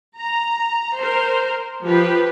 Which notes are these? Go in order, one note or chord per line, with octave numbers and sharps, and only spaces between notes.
A#5
A#4 C5
F3 G4 B4